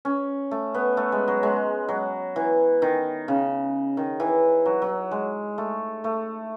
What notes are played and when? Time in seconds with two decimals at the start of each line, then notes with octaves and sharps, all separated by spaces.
0.05 C#4
0.51 A3
0.74 B3
0.97 A3
1.12 G#3
1.28 F#3
1.43 G#3
1.89 F#3
2.36 E3
2.82 D#3
3.28 C#3
3.97 D#3
4.20 E3
4.66 F#3
4.82 F#3
5.11 G#3
5.58 A3
6.04 A3